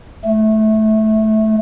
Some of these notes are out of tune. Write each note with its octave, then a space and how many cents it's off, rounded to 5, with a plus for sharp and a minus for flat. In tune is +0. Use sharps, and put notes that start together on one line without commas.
A3 -15